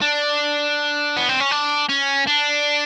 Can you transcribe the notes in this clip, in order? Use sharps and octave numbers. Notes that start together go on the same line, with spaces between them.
D4
B3
C4
C#4
D4
C#4
D4